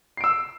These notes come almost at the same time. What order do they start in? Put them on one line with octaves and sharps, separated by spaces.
C7 D7 E6